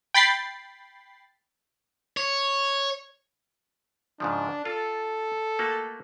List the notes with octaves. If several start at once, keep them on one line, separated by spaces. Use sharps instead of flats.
G5 B5 A6 C7
C#5
G#2 C#3 F3 D4
F4 A4
A3 A#3 F#4